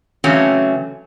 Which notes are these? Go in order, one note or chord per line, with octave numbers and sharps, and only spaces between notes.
C#3 E3 F#3 A3 C4 C#4